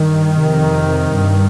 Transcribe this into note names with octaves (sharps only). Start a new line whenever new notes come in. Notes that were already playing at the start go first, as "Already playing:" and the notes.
Already playing: G2 D#3
F2 C3
G2